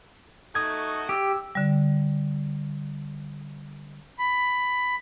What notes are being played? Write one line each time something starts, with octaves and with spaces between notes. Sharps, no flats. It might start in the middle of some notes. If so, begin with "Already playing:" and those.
A3 D#4 F#4 D#6 G#6
G4 E6
D3 G3
B5